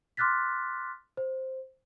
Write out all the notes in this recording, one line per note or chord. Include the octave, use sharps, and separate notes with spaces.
C6 D6 F6 F#6 A6 B6
C5